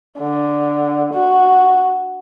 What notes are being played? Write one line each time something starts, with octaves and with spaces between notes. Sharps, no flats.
D3
F#4